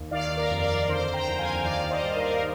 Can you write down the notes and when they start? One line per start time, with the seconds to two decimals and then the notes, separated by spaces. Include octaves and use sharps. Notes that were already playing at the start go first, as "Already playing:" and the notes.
Already playing: D#2
0.11 D#3 D5 F5
0.37 A#4 D5
0.50 F2
0.63 A#4 D5
0.88 D3 C5
1.13 G5 A#5
1.26 D#2
1.39 F5 G#5
1.65 D#3 D5 F5
1.90 C5 D#5
2.03 G2
2.16 A#4 D5
2.30 A#4